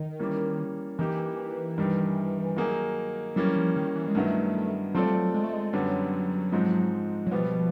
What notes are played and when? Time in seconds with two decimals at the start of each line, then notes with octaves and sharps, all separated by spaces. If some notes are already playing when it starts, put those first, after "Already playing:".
Already playing: D#3
0.19 E3 G3 A#3 C#4
0.99 E3 A#3 D#4 G4
1.78 G2 D#3 G3
2.56 D#3 F#3 A#3 D#4 G#4
3.36 E3 F#3 G3 A#3 C#4
3.56 F3
3.76 D#3
3.95 E3
4.07 G#3
4.15 G2 D#3 F#3 A3 B3 E4
4.95 F#3 A3 C4 F4 A4 D5
5.04 G3
5.15 F#3
5.34 G#3
5.44 A3
5.54 G#3
5.73 F#2 D3 F#3 G3 B3
6.52 G#2 F3 G#3 C4 D#4
7.26 F#3
7.31 B2 F3 G3 B3